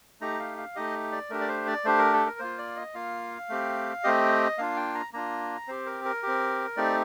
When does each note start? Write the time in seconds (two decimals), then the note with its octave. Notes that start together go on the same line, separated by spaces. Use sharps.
0.21 A3 D#4 G4 A#5
0.40 F5
0.58 F5
0.75 A3 D#4 G4 D#5
1.12 D5
1.30 A3 D4 G4 A#4
1.41 D5
1.48 C5
1.67 D5
1.85 A3 D4 G4 C5
1.99 A#4
2.13 A4
2.27 A#4
2.39 A#3 F4 C5
2.58 D5
2.76 D#5
2.95 A#3 F4 F5
3.49 A3 C4 G4
4.04 A3 C4 G4 D#5
4.58 A#3 D4 F4 F5
4.77 G5
4.95 A#5
5.13 A#3 D4 F4 A#5
5.68 C4 G4 C5
5.86 A#4
6.05 A#4
6.23 C4 G4
6.77 A3 C4 D#4 G4 D5